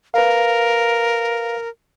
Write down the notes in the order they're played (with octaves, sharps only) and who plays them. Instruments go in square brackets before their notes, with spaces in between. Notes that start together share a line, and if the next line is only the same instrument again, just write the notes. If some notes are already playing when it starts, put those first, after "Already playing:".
[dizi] A#4 [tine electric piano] B4 F5